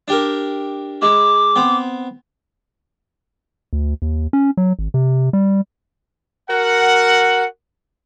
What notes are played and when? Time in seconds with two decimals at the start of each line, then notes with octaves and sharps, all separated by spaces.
0.08 D4 G4 A#4
1.02 G#3 E4 D6
1.56 B3 C4
3.73 D2
4.02 D#2
4.33 C#4
4.57 F#3
4.79 G#1
4.94 C3
5.33 G3
6.49 F#4 A#4 F#5